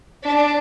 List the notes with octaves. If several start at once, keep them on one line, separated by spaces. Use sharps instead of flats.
D4